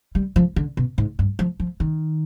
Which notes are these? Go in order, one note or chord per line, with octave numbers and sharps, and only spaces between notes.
G3
F3
D3
B2
G#2
G2
F3
F3
D#3